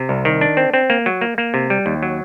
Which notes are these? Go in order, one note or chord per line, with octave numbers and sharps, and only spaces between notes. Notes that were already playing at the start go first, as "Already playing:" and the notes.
Already playing: C3
C2
D#3
D4
C4
C4
A#3
F#3
A#3
A#3
C3
G3
D#2
F#3